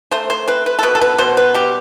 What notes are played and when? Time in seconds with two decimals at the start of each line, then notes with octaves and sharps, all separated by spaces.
0.11 A3 C5
0.30 C5
0.48 C4 B4
0.66 B4
0.79 A4
0.83 B2 B4
0.95 A4
1.01 B4
1.18 B2 C5
1.37 B4
1.54 G3 G4